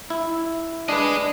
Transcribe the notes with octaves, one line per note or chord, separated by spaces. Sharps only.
E4
D4 G#4 B4 D#5